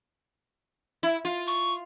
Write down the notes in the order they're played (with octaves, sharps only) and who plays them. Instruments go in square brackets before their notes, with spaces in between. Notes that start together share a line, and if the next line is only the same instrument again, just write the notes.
[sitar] E4
F4
[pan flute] C#6